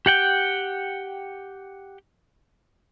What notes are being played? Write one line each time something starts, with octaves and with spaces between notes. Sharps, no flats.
G4 F#5 G5